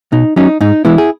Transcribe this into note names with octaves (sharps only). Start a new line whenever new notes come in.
B2 D#4
F#3 C#4 D#4
G#2 D#4
E3 G#3 B3 E4
G#4